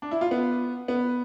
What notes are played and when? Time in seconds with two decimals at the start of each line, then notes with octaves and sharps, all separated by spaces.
0.02 D4
0.11 E4
0.21 F4
0.31 B3
0.88 B3